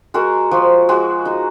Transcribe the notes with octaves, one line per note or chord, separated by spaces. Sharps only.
G#3 F#4 A#4
F3 F#4
G#3 F#4
D#4